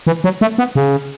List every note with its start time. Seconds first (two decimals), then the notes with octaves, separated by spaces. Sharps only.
0.07 E3
0.24 F#3
0.41 A3
0.58 B3
0.75 C#3